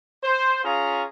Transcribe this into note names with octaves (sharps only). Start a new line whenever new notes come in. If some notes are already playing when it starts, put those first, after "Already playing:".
C5
C#4 F4 G#4 F5 A#5